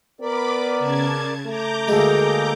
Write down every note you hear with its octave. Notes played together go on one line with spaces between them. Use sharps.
B3 A#4 D5 B5 D6
C#3 A5 G#6
A3 A#5 D6 G6
D2 G#3 A#3 G#4 A4